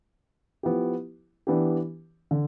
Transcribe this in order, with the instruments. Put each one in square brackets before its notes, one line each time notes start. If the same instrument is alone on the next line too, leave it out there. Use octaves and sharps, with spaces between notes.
[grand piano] F3 B3 E4 G4
E3 B3 D4 G4
D3